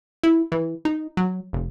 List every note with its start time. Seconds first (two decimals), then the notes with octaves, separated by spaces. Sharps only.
0.23 E4
0.52 E3
0.85 D#4
1.17 F#3
1.53 F1